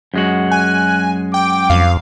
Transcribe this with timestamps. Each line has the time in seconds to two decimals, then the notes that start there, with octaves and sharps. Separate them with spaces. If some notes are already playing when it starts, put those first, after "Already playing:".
0.14 F#2 G#3 F#4
0.51 G#5 F#6
1.34 G5 D6
1.70 F2 F5